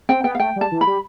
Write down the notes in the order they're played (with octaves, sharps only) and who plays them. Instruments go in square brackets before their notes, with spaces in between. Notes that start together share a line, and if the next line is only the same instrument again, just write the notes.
[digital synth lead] C4 [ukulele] G5
[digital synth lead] B3 [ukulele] G5
[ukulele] F5
[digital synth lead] A3 [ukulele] G5
[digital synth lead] G3
[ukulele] A5
[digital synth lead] E3
[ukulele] B5
[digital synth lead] G3